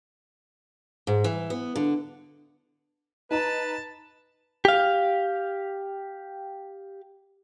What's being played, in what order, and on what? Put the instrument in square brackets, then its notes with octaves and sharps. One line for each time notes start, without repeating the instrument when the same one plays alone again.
[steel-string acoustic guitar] G#2
E3
B3
D3
[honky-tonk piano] D#4 A#5 [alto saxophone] B4 [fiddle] A5
[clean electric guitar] G4 F5